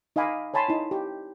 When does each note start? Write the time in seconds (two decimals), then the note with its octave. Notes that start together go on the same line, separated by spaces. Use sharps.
0.16 D#4 D#5 F5 G#5 B5 D6
0.54 C#5 G#5 A5 B5 C6
0.68 D#4 E4
0.91 G4